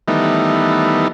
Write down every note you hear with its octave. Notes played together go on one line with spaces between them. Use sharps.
D#3 E3 G3 A3 B3 D#4